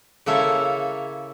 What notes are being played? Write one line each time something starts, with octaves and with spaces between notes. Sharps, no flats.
C#3 A#3 E4 A4 C#5